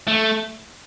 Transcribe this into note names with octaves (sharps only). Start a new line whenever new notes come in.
A3